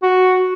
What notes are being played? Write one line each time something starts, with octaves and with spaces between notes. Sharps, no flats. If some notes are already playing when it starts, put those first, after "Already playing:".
F#4